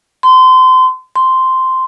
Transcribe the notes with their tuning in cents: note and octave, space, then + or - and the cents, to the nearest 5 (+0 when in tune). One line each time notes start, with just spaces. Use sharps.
C6 -30
C6 -5